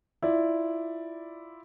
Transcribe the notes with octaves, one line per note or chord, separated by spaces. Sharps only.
E4 F4 D5